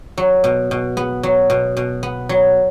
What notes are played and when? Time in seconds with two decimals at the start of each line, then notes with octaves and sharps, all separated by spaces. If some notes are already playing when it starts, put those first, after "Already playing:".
0.18 F#3
0.44 B2
0.71 B2
0.97 B3
1.23 F#3
1.50 B2
1.77 B2
2.03 B3
2.29 F#3